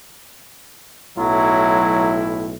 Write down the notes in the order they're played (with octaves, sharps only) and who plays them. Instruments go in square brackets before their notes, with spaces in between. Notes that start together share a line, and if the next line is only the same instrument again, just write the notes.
[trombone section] B1 A2 E4 [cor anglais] F#3